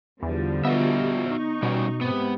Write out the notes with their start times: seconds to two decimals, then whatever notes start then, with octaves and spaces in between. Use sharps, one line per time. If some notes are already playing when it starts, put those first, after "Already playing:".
0.23 E2 D3 F3 G3
0.65 B3 F#4 D#5 E5
1.27 D#4 C#6
1.63 B2 G3 C#4
2.01 G#2 C3 B3